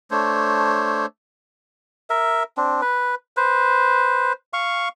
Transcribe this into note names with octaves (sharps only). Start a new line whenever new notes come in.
A3 D4 C5 C#5
A#4 E5
C4 D4
B4
B4 C5
F5 C#6